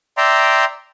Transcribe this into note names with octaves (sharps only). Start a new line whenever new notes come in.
D5 E5 G5 A#5 C6